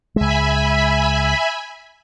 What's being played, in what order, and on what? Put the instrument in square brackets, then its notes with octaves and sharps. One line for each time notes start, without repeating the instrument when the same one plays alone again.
[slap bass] C#2 G#3 [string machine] E5 G#5 B5